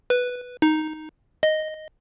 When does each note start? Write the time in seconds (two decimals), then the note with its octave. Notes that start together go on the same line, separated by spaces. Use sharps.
0.10 B4
0.62 D#4
1.43 D#5